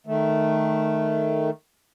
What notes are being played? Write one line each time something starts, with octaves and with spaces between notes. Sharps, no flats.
D#3 A3